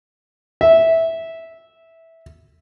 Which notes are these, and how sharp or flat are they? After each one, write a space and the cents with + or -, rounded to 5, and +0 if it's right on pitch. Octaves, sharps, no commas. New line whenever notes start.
E5 -10